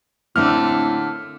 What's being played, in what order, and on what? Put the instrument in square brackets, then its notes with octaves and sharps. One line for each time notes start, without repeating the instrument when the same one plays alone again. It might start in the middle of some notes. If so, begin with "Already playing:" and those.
[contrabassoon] A2 [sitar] D3 A3 A#3 [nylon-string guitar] C4 D4 [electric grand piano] F6